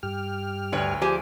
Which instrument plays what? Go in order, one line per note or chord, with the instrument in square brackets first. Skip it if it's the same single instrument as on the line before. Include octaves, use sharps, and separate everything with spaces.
[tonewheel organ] G2 G4 F6
[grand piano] D2 [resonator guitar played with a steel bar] B4 C#5 G5
[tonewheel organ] F3 G#4 [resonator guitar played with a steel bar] G4 C5 G#5